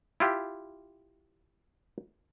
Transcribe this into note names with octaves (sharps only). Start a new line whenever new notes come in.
E4 F4 G4